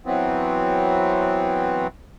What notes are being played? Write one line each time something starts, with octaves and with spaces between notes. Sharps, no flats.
E3 F#3 B3 C4